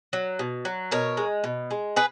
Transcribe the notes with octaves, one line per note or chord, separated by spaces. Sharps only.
F#3
B2
F#3
B2 A#4 C#5
G#3
B2
G#3
G#4 B4